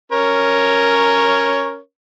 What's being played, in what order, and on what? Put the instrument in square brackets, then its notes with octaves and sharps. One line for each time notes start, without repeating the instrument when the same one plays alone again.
[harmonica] C#4 A#4 C#5